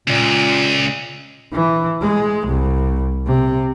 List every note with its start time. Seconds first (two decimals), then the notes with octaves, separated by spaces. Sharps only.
0.08 C#2 A#2
1.53 E3
2.02 G#3
2.47 C2
3.27 C3